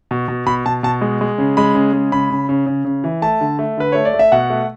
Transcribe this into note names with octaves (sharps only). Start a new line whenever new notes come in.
B2
B2
B2 B5
B2 A5
B2 A5
G#3
G#3
C#3
G#3 B5
C#3
G#3
C#3 B5
C#3
C#3
C#3
C#3
E3
A3 A5
D3
A3
D3 B4
A3 C#5
D5
A3
E5
B2 F#5
A3